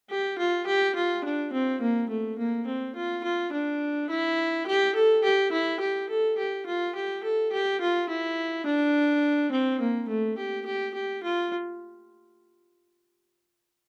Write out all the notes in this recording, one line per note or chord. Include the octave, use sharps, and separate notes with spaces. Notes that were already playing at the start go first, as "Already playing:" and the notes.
G4
F4
G4
F4
D4
C4
A#3
A3
A#3
C4
F4
F4
D4
E4
G4
A4
G4
E4
G4
A4
G4
F4
G4
A4
G4
F4
E4
D4
C4
A#3
A3
G4
G4
G4
F4